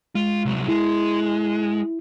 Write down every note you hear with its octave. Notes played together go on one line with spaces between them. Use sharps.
G#3 F4
C2 F#3
G#3 E4